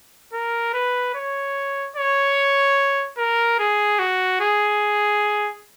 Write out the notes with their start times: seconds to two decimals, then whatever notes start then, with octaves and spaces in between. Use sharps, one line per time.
0.33 A#4
0.74 B4
1.15 C#5
1.96 C#5
3.18 A#4
3.59 G#4
3.99 F#4
4.41 G#4